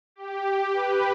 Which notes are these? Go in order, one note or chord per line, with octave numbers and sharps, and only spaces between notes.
G4
B4